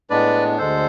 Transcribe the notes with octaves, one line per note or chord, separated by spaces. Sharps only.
A2 G#3 B3 D4 B4 D5
D2 D3 G#3 A4 C5